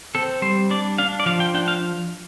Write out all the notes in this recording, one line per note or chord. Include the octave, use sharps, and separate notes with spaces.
C4 A4
G3 C5
D4 D5
D4 F5
D5
F3 F5
G5
D4 G5
F5